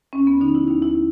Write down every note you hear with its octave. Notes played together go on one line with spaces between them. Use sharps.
D#2 C#4
B3
D3 F3 D#4
E4
D#2 D#4
E4